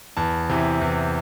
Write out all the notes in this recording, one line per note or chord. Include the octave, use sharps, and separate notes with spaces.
E2 A5
C3 E3
E2